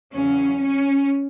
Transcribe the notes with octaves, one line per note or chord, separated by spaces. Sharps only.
E2 C#3 F#3 C#4
C#4